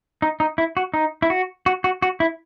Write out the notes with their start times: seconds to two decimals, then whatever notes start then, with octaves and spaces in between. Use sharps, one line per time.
0.22 D#4
0.40 D#4
0.58 E4
0.77 F#4
0.94 D#4
1.22 E4
1.30 F#4
1.66 F#4
1.84 F#4
2.02 F#4
2.20 E4